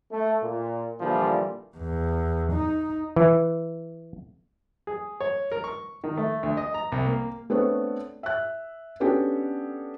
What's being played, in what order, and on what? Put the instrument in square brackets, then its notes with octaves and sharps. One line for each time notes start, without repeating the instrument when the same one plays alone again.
[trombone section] A3
A#2
A#2 D3 E3 F3 G3
[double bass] E2
D#4
[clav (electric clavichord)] E3
[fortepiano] G#4
C#5
A#4
C#6
D#3
A3
D2
D#5
A#5
C2
A#3
[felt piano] A3 B3 C4 D4 A4 C#5
E5 F#6
B3 C#4 D4 F#4 G4 A4